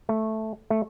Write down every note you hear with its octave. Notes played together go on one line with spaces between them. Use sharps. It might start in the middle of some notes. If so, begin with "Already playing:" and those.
A3
A3